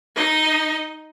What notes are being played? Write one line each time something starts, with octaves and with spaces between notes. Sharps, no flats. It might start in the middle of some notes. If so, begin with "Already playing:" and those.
D#4 D#5